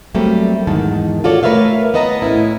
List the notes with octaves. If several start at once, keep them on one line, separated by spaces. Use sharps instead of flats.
F#3 G3 A3 A#3 C4
E2 G#2 D#3 A5
F4 F#4 A4 C#5 D5
A3 A#4 B4 C#5 E5 F5
B3 B4 D#5 A5 A#5
A2 C#4 E4